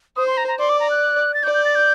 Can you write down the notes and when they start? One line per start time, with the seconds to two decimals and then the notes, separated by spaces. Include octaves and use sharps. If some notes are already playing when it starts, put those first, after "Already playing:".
0.16 C5 D#6
0.27 C6
0.37 A#5
0.48 A#5
0.59 D5 C6
0.69 D6
0.80 A#5
0.90 F#6
1.34 A6
1.43 D5 G6
1.54 G6
1.65 A6
1.75 G6